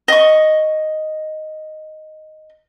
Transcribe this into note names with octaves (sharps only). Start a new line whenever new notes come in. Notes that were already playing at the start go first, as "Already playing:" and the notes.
D#5 C#6